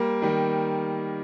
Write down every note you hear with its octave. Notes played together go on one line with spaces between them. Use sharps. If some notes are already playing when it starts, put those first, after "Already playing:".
Already playing: G3 A#3
D#3 G3